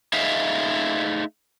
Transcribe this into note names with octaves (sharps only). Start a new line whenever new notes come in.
A3 D#4 G#4 E5 F5